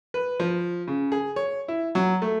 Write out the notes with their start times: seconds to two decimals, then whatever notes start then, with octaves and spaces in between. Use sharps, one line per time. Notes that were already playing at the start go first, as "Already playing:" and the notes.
0.14 B4
0.40 F3
0.87 C#3
1.12 G#4
1.36 C#5
1.68 E4
1.95 F#3
2.22 A3